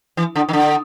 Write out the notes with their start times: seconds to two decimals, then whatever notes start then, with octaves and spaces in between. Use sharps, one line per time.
0.17 E3
0.35 D3
0.49 D#3
0.53 D3